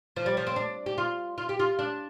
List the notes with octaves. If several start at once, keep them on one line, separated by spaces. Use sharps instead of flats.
F3
G3
F3
C4
D4
G4
F4
F4
G4
F4
D4